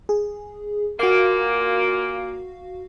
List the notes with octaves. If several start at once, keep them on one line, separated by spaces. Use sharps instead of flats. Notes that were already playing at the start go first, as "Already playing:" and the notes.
G#4
A#2 A#3 F#4 F5